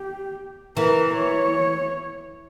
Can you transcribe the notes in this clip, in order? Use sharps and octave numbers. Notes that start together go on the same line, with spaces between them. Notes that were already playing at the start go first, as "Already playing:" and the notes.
Already playing: G4
E3 A#4
C#5